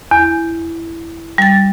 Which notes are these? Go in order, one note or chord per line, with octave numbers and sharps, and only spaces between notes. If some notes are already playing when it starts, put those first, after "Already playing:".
E2
G3 A6